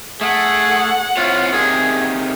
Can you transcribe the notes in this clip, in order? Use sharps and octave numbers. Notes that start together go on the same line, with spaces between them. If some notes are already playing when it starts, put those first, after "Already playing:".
A3 G#4 F#5
C4 E4 F4 C#5
C3 D#3 G#4